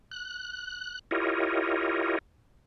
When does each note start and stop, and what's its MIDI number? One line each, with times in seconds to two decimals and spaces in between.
0.11 0.99 90
1.11 2.18 64
1.11 2.18 65
1.11 2.18 67
1.11 2.18 70
1.11 2.18 73
1.11 2.18 75